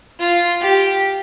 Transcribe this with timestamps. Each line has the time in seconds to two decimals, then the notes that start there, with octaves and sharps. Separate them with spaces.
0.19 F4
0.61 G4